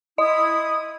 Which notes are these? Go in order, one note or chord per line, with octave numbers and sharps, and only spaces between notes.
E4 D#5 D#6